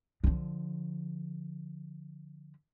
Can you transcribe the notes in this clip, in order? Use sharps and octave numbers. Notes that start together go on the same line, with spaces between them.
D3 F3